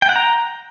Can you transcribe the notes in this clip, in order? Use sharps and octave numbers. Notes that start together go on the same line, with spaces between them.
G5
F#5
A#5